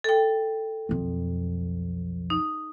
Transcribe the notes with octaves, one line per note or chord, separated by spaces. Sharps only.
A4 G5
B1 F2
D#4